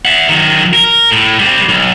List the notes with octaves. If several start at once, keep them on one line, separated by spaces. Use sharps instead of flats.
E5 F#5
D#3 F#3
A#4
A2
G3 C4
B1